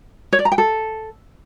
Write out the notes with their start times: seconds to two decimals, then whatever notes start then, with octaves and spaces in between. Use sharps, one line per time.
0.33 C#5
0.39 D5
0.45 A#5
0.52 G5
0.58 A4